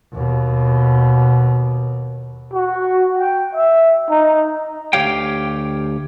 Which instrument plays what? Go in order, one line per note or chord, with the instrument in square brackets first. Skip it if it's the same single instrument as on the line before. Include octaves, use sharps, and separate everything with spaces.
[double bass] D#2 B2
[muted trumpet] F#4
G5
E5
D#4
[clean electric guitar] D2 G4 C#5 F5 G5